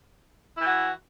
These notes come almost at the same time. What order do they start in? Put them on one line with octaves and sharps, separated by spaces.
E4 E3 F#4